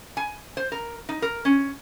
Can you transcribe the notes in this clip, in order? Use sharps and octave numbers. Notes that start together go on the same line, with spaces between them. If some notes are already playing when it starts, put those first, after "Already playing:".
G#5
C5
A#4
D#4
A#4
C#4